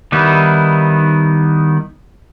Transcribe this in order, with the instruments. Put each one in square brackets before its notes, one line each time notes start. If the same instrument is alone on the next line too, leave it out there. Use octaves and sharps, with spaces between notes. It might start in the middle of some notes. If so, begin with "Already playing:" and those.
[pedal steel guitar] D#3 G3 B3 D#4 E4